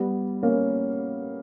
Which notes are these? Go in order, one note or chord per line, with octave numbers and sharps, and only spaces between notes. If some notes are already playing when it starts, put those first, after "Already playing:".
Already playing: G3 B3
A#3 C#4